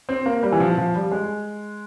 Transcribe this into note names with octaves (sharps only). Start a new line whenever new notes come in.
C4
A#3
G3
E3
F3
F3
G3
G#3